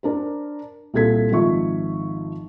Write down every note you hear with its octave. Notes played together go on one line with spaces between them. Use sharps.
D4 A#4 C5
C2 A#2 A4 G#6 B6
G#1 D#3 F3 F4 E5 C#6